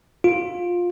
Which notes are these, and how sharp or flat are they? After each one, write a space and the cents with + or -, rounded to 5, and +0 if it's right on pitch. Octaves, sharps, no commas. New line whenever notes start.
F4 +15